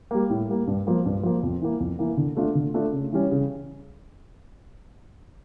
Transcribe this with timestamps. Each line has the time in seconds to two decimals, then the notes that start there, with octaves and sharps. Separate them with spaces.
0.11 G3 A#3
0.30 A2
0.49 G3 A#3
0.67 G2
0.87 F3 A#3
1.06 G2
1.23 F3 A#3
1.43 F2
1.62 E3 A#3
1.80 F2
1.99 E3 A#3
2.17 D3
2.37 A3 D4 F4
2.55 D3
2.74 A3 D4 F4
2.93 C#3
3.12 E3 G3 C#4
3.31 C#3